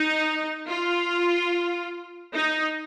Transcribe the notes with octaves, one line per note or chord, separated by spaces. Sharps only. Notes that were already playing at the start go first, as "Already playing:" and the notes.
Already playing: D#4
F4
D#4